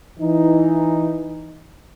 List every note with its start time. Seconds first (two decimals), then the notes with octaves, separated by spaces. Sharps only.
0.20 E3 D#4